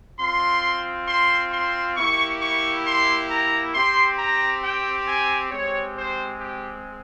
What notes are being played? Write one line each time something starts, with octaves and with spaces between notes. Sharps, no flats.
C4 F4 C6
C6
C6
A#3 E4 G4 C#6
C#6
C6
A#5
C4 G4 C6
A#5
G5
G#5
G#3 C4 G4 C#5
C5
G4